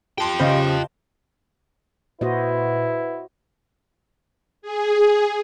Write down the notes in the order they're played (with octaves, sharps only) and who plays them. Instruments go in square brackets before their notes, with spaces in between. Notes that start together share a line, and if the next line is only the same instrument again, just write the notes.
[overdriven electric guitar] F4 G5 [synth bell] G4 A5 C6
[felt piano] C#3 [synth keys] C5 D#5 F5
[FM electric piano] A#2 [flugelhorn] E4 [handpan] F#4 C5 D#5 [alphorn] B4
[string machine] G#4